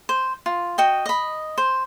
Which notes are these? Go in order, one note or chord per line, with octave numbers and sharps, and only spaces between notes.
C5
F4
F#4 D#5 G5
D#5 B5
C5